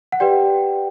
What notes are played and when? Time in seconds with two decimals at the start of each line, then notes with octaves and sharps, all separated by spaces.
0.12 F#5
0.20 G4 B4 D5 G5